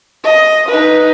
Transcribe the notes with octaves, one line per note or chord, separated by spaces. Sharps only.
D#5
D#4 B4